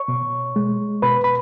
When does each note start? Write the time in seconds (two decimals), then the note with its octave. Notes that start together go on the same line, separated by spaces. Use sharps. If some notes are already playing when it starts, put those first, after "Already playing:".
Already playing: C#5 C#6
0.08 B2
0.56 G#3
1.02 B2 B4 B5
1.24 B5